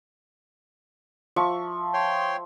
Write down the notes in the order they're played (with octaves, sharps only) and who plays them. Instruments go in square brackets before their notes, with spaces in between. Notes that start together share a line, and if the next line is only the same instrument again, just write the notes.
[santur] F3 E5 C#6
[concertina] C#5 G5 C6